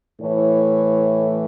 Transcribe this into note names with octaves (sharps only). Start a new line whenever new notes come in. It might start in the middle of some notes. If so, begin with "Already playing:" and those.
A2 E3 A3 C#5